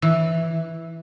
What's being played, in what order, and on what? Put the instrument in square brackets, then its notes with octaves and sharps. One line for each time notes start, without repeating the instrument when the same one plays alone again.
[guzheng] E3